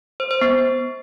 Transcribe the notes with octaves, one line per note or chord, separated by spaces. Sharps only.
C5
C5
B3